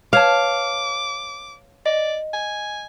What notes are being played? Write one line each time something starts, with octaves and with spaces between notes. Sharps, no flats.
B4 C#5 F5 A5 D6
D5 D#5
G#5